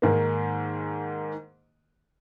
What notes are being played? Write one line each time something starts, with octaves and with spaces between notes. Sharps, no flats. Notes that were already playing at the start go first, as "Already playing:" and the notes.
G#2 D#3 A#3